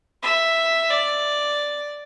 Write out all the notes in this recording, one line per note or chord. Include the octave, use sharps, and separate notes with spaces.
E5
D5